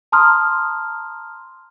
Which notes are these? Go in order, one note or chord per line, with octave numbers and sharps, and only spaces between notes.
A5 A#5 C6 D#6 F6